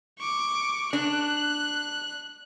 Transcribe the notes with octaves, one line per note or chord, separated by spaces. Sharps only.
C#6 D6
D4 F#6